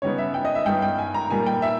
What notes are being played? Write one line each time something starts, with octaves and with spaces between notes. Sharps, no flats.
C#3 G3 B3 D#4 C#5
E5
G5
D#5
E5
G2 G3 B3 D#4 G5
G5
G#5
A#5
A#2 G3 A#3 D#4 G#5
G5
E5